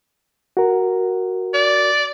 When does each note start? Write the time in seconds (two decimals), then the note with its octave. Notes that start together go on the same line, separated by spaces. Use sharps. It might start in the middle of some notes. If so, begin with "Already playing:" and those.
0.57 F#4 A#4
1.54 D5